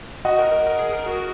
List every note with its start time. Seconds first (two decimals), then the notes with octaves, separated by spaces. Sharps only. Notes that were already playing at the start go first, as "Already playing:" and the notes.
0.25 F#4 D#5 F#5
0.39 A#4
0.52 A#4
0.66 A#4
0.79 G#4
0.93 A#4
1.06 F#4